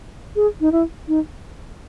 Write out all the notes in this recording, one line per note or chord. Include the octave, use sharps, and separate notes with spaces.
G#4
D#4
E4
D#4